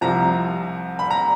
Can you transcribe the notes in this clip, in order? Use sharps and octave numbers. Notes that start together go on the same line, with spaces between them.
C2 C3 F3 A#5
B5
A#5